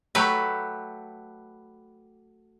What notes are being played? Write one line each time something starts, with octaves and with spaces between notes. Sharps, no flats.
F#3 A3 G4 B4